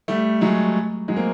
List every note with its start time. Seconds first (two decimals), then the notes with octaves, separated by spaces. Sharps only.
0.08 G3 A3
0.41 F#3 G#3
1.08 F#3 G#3
1.16 A#3 C4